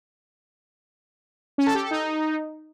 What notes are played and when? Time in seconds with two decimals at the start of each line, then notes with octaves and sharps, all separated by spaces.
1.58 C#4
1.66 A4
1.74 G4
1.83 A4
1.91 D#4